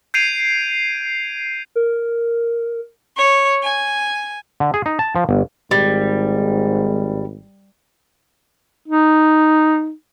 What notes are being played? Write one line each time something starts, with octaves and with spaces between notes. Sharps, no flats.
G6 G#6 C7 D7 D#7 F7
A#4
C#5
G#5
D3
G#4
D#4
A5
F3
G1
G#1 G#2 G3
D#4